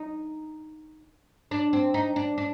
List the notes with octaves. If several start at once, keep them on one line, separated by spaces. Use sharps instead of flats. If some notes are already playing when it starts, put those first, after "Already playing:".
Already playing: D#4
D4
C4
D#4
D4
D4